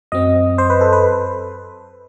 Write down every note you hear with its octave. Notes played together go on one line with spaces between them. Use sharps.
F#2 F#3 C4 D#5
C5
B4
A4
B4